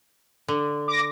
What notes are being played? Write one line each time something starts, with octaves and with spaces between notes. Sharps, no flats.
D3
D6 A#6